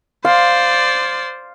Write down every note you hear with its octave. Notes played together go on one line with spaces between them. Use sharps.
C5 D5 F5 C6